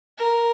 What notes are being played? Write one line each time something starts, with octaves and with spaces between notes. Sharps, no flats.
A#4